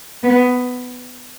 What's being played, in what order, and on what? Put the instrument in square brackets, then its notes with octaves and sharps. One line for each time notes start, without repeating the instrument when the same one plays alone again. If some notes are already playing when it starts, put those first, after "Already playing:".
[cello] B3